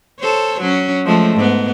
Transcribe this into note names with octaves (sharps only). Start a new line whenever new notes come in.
A4 C5 C#5
F#3 C#4
F3 G#3 A3
G#2 B3